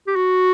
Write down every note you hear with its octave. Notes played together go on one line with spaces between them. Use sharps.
G4
F#4